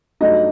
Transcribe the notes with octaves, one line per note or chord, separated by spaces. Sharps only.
G2 F#3 A3 D4 D#4 D#5